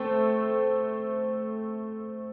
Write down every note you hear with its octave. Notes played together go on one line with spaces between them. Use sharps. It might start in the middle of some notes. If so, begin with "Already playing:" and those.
Already playing: A3 C4